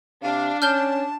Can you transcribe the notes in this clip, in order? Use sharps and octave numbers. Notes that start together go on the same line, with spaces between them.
C3 D4 F5
C#4 A5 F6 G6 G7